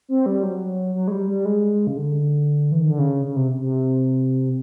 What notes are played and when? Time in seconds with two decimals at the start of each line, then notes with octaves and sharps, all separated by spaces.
0.09 C4
0.26 G3
0.43 F#3
0.95 F#3
1.08 G#3
1.12 G3
1.28 G3
1.45 G#3
1.87 C#3
1.97 D3
2.72 E3
2.80 D#3
2.89 D3
2.99 C#3
3.25 C#3
3.36 C3
3.60 C3